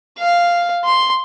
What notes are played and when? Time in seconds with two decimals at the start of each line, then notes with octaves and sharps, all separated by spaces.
0.19 F5
0.85 C6